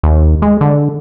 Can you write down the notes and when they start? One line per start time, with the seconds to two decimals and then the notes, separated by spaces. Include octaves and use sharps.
0.03 D#2
0.42 G#3
0.61 D3